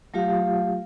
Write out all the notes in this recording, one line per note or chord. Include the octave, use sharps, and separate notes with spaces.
F#3 A3 F4 G4 F5